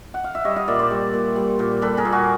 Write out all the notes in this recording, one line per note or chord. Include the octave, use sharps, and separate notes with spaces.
F#5
F5
E5
G3 C#5 D#5
D#5 F5
A#2 D5 E5
C5 D5
G3
A#2
G3
A#2
G3 A4 B4
G#4 A#4
A#2
F#4 G#4